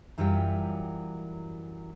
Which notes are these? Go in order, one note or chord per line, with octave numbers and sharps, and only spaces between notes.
F#2 E3 F#3 G3 F4 G5